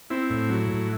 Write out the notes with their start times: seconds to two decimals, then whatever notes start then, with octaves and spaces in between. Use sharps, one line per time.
0.10 C4 E4
0.30 A2
0.49 F#3
0.70 A2